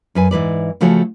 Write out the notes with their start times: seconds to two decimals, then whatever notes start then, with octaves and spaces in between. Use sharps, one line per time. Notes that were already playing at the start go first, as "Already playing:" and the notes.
0.15 F#2 B4 G#5
0.31 G#2 E3 B4 D5
0.81 C#3 F3 A3 F#4 G#4 C#5